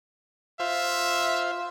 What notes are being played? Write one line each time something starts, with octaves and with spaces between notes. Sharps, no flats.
F4 C5 E5 F5